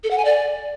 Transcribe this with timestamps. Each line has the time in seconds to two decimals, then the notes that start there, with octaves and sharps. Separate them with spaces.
0.04 A4
0.11 F#5
0.18 G#5
0.25 D5